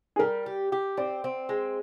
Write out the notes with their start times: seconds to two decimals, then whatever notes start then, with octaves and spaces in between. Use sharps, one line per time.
0.16 G#4
0.19 G3 A#4
0.46 G4
0.72 G4
0.97 C4 D5
1.24 C4
1.49 G#3